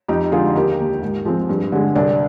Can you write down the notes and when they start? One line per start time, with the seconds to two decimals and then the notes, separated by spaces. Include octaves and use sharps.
0.08 F2 D#4 G4
0.32 D3 G#3 F4 G#4
0.55 D#2 G4 A#4
0.79 D#3 A#3
1.02 G#2
1.25 F3 G#3 C4
1.49 G2
1.72 D3 G#3
1.95 C2 D4